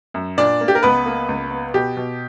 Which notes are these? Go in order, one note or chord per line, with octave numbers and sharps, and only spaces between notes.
F#2
A#2 D4 D5
A#3
G4
A#4
C#2 B3 B4
A#3
C#2
B3
B2 G4
B2